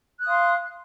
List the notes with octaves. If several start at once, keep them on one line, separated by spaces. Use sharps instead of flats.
F5 C6 D#6 F#6